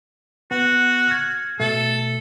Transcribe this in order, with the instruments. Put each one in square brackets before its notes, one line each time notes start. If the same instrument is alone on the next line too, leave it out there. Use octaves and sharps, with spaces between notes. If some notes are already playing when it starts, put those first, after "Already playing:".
[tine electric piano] B3 [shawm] F#4
[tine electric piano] F6 G#6
[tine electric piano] B2 A3 [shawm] A4